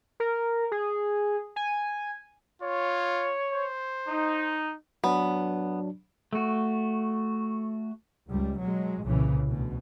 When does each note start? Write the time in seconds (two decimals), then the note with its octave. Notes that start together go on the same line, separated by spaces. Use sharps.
0.20 A#4
0.72 G#4
1.56 G#5
2.62 F4 C#5
3.52 C5
4.08 D#4
5.04 F#3 B3 D4
6.33 A3 F#4
8.28 C#2 G3
8.59 B2 F#3 G#3
9.03 C2 A#2 C#3 E3
9.47 D2 B2